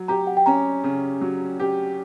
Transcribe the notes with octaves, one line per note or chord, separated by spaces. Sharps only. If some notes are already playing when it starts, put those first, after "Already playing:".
Already playing: F#3
G4 A#5
F#5
G5
C#4 A#5
C#3
F#3
G4